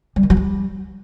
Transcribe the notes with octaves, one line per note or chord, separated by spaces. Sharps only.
G3
D#3
F#3
G3